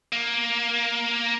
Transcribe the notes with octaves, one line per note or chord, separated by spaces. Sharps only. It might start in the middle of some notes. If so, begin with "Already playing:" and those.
A#3